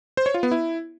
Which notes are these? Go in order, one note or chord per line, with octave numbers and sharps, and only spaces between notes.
C5
C#5
F4
B3
E4